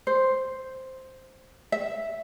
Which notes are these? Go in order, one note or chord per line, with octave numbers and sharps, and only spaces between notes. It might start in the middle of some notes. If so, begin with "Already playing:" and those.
C5
E5